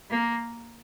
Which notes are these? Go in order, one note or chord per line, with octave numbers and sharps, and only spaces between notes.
A#3